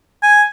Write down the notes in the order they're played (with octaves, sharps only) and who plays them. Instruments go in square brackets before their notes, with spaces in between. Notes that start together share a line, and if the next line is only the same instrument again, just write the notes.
[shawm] G#5